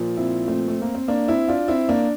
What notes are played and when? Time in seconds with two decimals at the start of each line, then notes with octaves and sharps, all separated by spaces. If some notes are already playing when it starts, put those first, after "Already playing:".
Already playing: A#2 F3
0.17 C4 E4
0.48 A3 C4
0.68 A3
0.82 A#3
0.95 C4
1.08 A#3 D4
1.28 C4 E4
1.48 D4 F4
1.68 C4 E4
1.89 A#3 D4